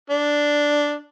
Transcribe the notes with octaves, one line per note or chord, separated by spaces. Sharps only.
D4